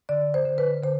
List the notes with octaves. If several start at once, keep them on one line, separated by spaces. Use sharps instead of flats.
D3 D5
C5
D3
B4
D3 C5